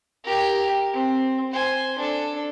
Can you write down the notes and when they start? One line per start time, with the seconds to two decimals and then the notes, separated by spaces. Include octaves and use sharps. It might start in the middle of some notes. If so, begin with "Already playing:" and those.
0.24 G4 A#4
0.93 C4
1.52 C5 G#5
1.98 D4 A4